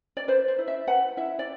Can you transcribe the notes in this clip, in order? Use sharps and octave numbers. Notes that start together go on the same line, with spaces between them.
D5
B4 C5
C5
E4
E5
B4 F#5
E4 E5
D5